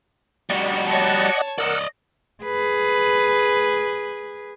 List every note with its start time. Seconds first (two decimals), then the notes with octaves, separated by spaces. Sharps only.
0.50 G3 F#4 D5 D#5 F#5
0.87 C#5 A5
1.58 A#4 D5 D#5 F#5 E6
2.44 G#4 B4